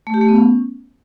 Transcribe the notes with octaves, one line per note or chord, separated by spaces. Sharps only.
A3
G4
A3
B3
C#4